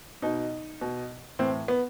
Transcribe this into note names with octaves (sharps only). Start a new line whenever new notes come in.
B2 D#4
B2
A2 E3 C4
B3